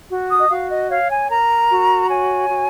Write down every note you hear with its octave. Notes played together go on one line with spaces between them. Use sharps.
F#4
D#6
D#5
F#4 F5
D#5
C#5 F5
G#5
A#4 A#5
F#4
C#5 G#5
F#4